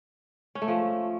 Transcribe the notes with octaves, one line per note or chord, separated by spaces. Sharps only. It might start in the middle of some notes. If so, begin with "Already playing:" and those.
C#4
A3
F3